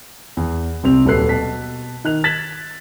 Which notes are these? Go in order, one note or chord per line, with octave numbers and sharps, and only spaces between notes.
E2
C2 C3 C4 F7
D#1 F#3 A4 B4 F#6 C7
B2 A5 B6
D#3 F#6 F7
G#6 A6 B6 E7 F#7